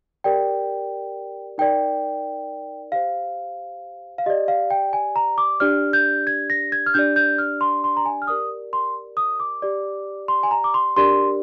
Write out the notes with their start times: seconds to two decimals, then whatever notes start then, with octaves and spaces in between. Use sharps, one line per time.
0.24 G4 A#4 D5 G5
1.58 D#4 A#4 D5 G5
2.92 G4 C5 F5
4.18 F5
4.26 G4 D5 D#5
4.48 F5
4.71 G5
4.93 G#5
5.16 A#5
5.38 D6
5.60 D4 G4 D5 F6
5.93 G6
6.27 G#6
6.50 A#6
6.72 G#6
6.86 F6
6.94 D4 G4 D5 G6
7.16 G6
7.38 F6
7.61 C6
7.84 C6
7.97 A#5
8.06 G#5
8.22 F6
8.27 G4 A#4 D5 D#6
8.73 C6
9.17 D#6
9.40 D6
9.62 G4 D5
10.28 C6
10.43 G#5
10.51 A#5
10.64 D6
10.74 C6
10.97 D4 G4 A#4 D5 C6